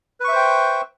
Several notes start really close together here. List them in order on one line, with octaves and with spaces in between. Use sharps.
B4 C#6 E5 C5 G5